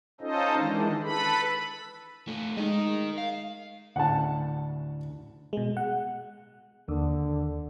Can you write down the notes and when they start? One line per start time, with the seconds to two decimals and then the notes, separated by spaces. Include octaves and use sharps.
0.21 C#4 D#4 F4 A4 C5 D#5
0.57 D#3 E3 G#3 D4
1.03 A4 B4 B5
2.27 A3 F4
2.57 G#3 D#4 A#4 D#5
3.18 F5
3.96 D2 A2 F#5 A5
5.53 B2 G#3
5.77 F#5
6.88 D#2 D3